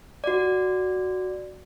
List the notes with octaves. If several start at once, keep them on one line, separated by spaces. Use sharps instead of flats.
F#4 D5